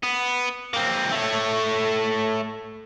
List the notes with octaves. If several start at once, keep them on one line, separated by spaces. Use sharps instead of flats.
B3
A#3 C4
A3 C#5